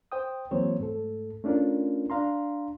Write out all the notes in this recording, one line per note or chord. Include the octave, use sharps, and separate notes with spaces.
C5 G5 D#6
E3 F#3 A#3 C4 C5 C#5
G#2 A3 A4
A3 C#4 D4 F4 A#4
D4 F5 A#5 C6